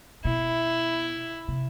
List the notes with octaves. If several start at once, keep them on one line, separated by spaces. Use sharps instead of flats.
B2 E4
C3